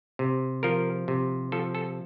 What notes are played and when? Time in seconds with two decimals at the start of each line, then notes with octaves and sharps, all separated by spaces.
0.19 C3
0.63 F3 A#4
1.08 C3
1.52 F3 A4
1.75 A4